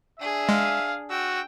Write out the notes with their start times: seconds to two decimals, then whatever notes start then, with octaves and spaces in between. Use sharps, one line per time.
0.19 D4 G#4 E5
0.49 G#3 F5
1.10 F#4 G5 E6